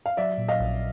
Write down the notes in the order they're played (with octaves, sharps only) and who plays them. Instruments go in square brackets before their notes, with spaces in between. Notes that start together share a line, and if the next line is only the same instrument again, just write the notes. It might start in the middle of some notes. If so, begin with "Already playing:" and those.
[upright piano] F5
[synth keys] F#3 [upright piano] D5 E5
[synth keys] A#2
[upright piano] D#5 F5
[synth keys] A#1